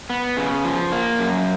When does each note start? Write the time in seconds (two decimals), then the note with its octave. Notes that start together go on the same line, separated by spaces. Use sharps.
0.10 B3
0.37 C#3
0.64 F3
0.92 A#3
1.19 F#2